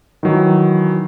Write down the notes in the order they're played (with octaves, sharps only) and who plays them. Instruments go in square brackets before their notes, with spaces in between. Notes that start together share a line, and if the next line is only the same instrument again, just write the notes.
[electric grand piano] D#3 E3 F#3